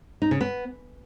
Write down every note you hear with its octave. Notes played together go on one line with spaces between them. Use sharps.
D#4
C#3
B3